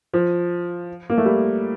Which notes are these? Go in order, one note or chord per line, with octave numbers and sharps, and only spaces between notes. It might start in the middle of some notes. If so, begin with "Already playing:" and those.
F3
A#3
A3
G3